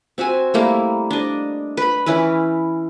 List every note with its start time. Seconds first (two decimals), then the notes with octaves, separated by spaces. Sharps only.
0.18 C4 F#4 E5 G#5
0.54 G3 A3 A#3 E4
1.11 D4 D#5
1.77 B4 B5
2.06 E3 C#4 E4 B4